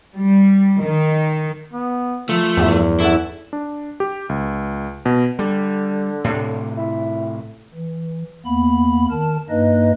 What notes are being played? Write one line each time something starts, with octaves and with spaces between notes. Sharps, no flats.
G3
D#3
B3
F3 A3 A#3 F4
E2 G2
C#4 E4 A4 F#5
D4
G4
C#2
B2
D3 G3
A2 C3
E4
E3
E2 A#3 B3 B5
D#3 A#4 A5
G2 A#3 D#4 B4 D#5